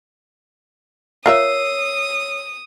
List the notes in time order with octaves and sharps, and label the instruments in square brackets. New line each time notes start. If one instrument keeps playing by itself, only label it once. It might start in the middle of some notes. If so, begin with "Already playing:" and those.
[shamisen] F4 A#4 E5 [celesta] C#5 E6 C7 [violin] D#6